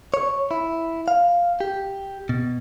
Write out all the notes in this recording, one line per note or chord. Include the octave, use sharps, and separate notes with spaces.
C#5
E4
F5
G4
B2